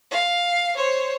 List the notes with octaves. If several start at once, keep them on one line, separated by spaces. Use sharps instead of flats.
F5
C5 C#5